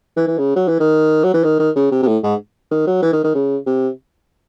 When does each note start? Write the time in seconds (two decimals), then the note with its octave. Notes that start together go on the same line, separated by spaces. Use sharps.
0.17 E3
0.27 E3
0.38 C#3
0.56 F#3
0.68 E3
0.80 D#3
1.24 F#3
1.33 E3
1.44 D#3
1.59 D#3
1.76 C#3
1.91 C3
2.03 C3
2.07 A2
2.23 G#2
2.71 D#3
2.87 F#3
3.02 E3
3.13 D#3
3.24 D#3
3.35 C#3
3.66 C3